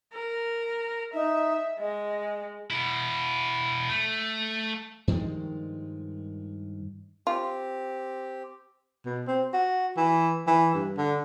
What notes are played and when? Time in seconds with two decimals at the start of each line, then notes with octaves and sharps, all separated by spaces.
0.13 A#4
1.14 D#4 E5
1.79 G#3 D#5
2.71 B2 E4
3.89 A3
5.08 G2 D#3 F3 G#3
7.27 C4 F4 G4
9.06 B2
9.27 C4
9.53 F#4
9.97 E3
10.47 E3
10.74 G2
10.97 D3